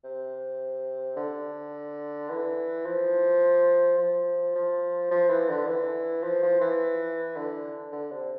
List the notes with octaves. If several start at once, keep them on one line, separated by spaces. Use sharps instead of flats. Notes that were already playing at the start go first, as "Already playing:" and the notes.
C3
D3
E3
F3
F3
F3
F3
E3
D3
E3
F3
F3
E3
D3
D3
C3